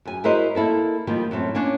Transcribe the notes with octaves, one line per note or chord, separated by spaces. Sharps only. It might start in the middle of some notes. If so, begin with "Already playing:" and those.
F#2 G#5
E4 F#4 A#4 C5 D#5
A#3 E4 A4 A#4
D#3 F3 G3 A#3
F#2 A2 A3 C4
A#3 C#4 D4 C#5